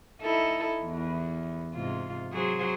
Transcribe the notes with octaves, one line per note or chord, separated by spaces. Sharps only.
D#4 E4 A4
E2
G#2 C3 F4
F#3 G#4 C5